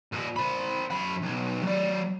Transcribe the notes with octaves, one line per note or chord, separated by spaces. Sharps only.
A#2 D#5
C4 B5
F#2 B5
B1
F#3 D5